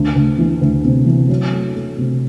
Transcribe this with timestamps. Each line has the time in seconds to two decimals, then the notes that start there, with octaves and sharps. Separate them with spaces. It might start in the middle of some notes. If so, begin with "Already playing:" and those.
Already playing: D2
0.15 D2
0.38 E3
0.61 D2
0.84 C3
1.06 E3
1.29 F#3
1.52 A3
1.75 A3
1.98 C3